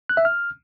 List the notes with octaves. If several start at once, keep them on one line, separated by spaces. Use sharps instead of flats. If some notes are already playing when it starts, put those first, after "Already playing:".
F#6
E5
F6